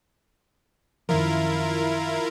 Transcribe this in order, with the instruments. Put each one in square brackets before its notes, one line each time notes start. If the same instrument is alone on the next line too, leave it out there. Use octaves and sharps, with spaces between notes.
[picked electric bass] F#2 D#3 F3 [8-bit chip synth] E4 F4 A#4